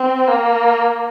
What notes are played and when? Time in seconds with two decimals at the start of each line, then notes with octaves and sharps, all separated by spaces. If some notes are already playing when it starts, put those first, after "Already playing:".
Already playing: C4
0.28 A#3